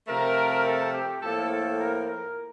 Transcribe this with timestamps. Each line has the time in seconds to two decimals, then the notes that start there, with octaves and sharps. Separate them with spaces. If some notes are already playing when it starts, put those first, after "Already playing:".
0.08 C3 F3 A3 A#4
0.65 A4
0.93 G4
1.22 A2 F3 A#3 A4
1.50 A4
1.78 A#4
2.07 A#4